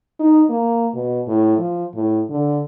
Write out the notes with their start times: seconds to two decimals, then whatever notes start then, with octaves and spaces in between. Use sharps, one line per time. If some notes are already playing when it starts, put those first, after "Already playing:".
0.20 D#4
0.50 A#3
0.94 B2
1.27 A2
1.58 F3
1.94 A2
2.30 D3